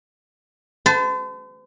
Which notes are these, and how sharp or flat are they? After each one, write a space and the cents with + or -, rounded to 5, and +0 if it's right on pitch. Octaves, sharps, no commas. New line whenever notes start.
C5 -45 A5 +0